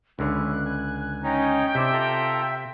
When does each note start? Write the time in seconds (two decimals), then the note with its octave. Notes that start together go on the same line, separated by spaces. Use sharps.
0.19 C#2 D3 C#4 E4 F#6
0.66 G#5
1.24 C#4 D#4 G5
1.75 C3 C4 D4 E4 E5
1.93 F4 A4 A#5